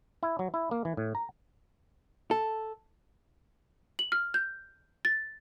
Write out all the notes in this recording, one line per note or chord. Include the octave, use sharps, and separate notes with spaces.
E4
F#3
E4
A#3
E3
A2
A#5
A4
F#7
F6
G6
A6